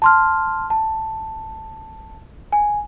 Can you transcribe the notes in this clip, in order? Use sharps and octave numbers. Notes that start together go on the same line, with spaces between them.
A5 C6 F6
A5
G#5